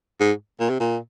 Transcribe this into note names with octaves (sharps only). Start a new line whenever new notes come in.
G#2
A#2
C3
A#2